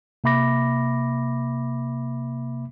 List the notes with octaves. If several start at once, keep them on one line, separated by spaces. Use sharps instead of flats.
C3 A#3 E5 B5 D6 A#6